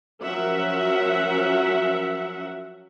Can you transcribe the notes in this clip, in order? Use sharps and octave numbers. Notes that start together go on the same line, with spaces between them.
F3 F#3 C#4 A#4 E5 F#5